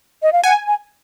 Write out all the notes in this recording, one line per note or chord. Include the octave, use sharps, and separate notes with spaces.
D#5
F5
F#5 G#5
G#5